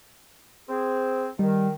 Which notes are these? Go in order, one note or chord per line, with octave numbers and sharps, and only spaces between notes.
C4 G#4
D#3 G3